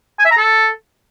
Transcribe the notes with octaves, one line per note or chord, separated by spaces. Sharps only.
G#5
E5
A#5
A4